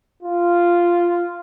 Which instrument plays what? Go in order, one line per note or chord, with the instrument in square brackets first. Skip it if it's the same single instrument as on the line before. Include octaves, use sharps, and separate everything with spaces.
[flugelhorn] F4